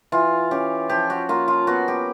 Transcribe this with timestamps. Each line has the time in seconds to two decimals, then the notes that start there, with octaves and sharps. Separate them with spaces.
0.12 E3 F4
0.51 C#4 G4
0.89 F3 G4
1.10 F#4
1.29 A#3 F4
1.48 F4
1.67 B3 F#4
1.88 G4